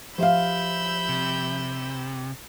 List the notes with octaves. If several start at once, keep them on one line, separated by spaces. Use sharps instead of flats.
F3 G4 C5 E5 F5 B5 E6 G6
C3